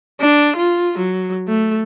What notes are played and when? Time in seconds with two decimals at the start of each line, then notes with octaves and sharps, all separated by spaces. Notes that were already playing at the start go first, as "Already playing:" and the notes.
0.21 D4
0.56 F4
0.99 F#3
1.48 A3